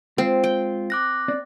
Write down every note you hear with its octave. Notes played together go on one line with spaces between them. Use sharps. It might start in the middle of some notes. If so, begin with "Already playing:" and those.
G#3 C4 F4
G5
D6 F#6 A#6
C4 D5